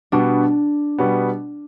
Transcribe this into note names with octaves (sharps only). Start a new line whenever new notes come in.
B2 G3 B3 D4
B2 G3 B3